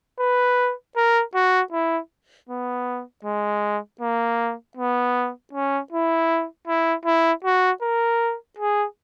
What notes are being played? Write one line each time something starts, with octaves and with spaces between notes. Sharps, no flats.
B4
A#4
F#4
E4
B3
G#3
A#3
B3
C#4
E4
E4
E4
F#4
A#4
G#4